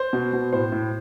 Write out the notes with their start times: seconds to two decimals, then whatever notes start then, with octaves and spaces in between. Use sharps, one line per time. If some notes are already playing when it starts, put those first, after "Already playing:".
Already playing: C5
0.13 B2
0.33 B2
0.53 A2 C5
0.72 A2